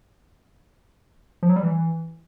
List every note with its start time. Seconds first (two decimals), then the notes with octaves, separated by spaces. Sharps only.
1.43 F3
1.49 F#3
1.56 G3
1.63 E3